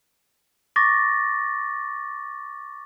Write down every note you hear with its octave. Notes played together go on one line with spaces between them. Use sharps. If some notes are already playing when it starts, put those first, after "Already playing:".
C#6 D6 A6 A#6